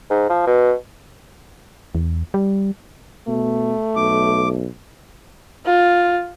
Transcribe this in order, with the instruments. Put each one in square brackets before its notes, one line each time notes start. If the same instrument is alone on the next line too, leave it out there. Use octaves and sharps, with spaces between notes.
[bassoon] G#2
F3
B2
[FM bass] E2
G3
[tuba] B2 [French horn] A3
[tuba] B1 [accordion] D6
[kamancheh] F4